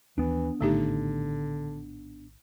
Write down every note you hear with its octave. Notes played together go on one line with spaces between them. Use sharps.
D#2 E3 B3 D4
A#1 A2 D3 D#3 A3 D#4 G4